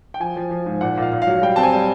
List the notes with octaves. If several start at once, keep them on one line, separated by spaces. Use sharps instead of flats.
G5
F3 G#5
F3
F3
G#2
A#2 F#5
A#2 F5
A#2
F5
F#3
G3 G5
C4 A5
G#5
G3